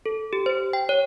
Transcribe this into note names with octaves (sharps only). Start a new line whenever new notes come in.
A4
G4
C5
G5
C#5